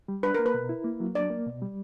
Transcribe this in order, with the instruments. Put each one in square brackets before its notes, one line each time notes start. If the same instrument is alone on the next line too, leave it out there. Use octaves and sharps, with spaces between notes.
[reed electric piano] G3
[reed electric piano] D4 [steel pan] B4
[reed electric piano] A#3 [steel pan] A#4
[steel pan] B4
[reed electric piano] B2
E4
A#3
F#3
[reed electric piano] D4 [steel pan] D5
[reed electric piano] A#3
B2
G3